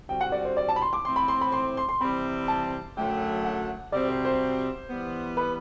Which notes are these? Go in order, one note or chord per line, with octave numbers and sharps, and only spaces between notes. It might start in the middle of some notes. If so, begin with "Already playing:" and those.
G2 D3 G3 C4 F#4 G5
F#5
D5
C5
D5
A5
B5
C6
D6
A2 E3 A3 C4 E4 C6
B5
C6
B5
C6
C6
C6
C3 E3 G3 C4 B5
A5
F#2 D3 F#3 A3 G5
F#5
C3 G3 C4 F#4 D5
C5
C5
E3 G3 B3
B4